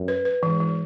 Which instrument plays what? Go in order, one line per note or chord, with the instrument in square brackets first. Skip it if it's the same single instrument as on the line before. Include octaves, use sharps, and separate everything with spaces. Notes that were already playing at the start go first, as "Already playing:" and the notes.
Already playing: [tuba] F#2
[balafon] B4
B4
[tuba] G#2 [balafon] E3
[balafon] E3